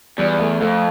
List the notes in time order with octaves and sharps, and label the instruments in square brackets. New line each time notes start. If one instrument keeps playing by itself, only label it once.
[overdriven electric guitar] E2 [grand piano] G3
[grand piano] A3
[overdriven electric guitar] F2 [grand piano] A3